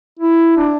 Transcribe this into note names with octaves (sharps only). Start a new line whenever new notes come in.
E4
D4